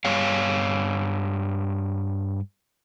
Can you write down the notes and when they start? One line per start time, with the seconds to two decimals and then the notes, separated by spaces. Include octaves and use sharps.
0.05 G2 C#5 F5